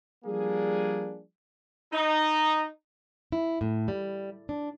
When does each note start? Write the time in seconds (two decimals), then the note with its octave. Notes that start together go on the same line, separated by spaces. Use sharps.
0.25 F3 G3 A#3 D4 G#4
1.93 D#4
3.32 E4
3.61 A2
3.88 G3
4.49 D4